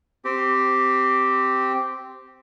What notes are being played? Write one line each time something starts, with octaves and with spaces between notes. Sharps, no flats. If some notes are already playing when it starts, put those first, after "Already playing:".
C4 G4